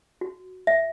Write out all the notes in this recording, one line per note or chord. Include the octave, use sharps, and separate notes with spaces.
F#4
E5